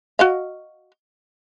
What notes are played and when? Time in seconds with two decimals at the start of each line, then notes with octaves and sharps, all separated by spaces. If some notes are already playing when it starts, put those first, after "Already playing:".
0.19 F#4 D#5 F5